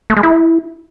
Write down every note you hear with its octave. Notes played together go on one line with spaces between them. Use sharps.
A3
G#3
E4